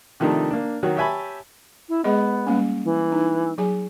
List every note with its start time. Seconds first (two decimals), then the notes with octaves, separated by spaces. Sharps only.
0.20 C3 D#3 F3 A3 D4 D#4
0.51 A#3 D4
0.83 D#3 F#3 F#4
0.97 G4 C#5 E5 G#5 A5 B5
1.89 E4
2.04 G#3 B3 G#4 D#5
2.47 G3 A#3 C#4
2.84 E3
3.12 D#4
3.58 F#3 G#4 G#5